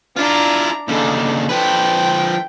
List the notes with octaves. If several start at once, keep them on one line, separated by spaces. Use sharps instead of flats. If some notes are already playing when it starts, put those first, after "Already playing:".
D4 E4 F4 A#5
D#2 C#3 D4 A4
F3 B4 G5